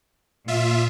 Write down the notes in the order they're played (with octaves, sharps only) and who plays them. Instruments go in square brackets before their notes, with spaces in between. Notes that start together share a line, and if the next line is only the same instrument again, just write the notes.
[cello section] A#2 [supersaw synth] F4 E5